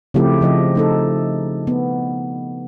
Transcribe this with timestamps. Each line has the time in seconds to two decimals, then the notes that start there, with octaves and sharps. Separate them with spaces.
0.14 C#3 F3 A3 C4 E4 G4
0.41 C#3 F3 D#5
0.75 A3 D#4 A4
1.67 B3